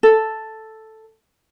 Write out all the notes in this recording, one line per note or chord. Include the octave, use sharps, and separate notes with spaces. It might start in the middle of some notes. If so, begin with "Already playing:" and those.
A4